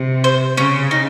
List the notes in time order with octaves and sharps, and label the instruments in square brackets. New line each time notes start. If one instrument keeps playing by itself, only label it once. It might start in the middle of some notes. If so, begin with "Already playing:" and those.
Already playing: [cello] C3
[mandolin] C5
[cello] C#3 [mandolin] C#4
[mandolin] D#4